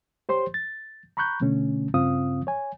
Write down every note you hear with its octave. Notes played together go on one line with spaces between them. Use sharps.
G4 C5 C#5 C6
A6
A#5 B5 C#6 F#6 G6
B2 D3 A3 C#4
G2 C#3 C4 F4 F5 D#6
C#5 G#5